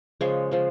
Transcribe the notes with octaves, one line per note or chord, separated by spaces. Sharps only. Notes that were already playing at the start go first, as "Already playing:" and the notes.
C#3 F3 G#3 C#5
C#3 F3 G#3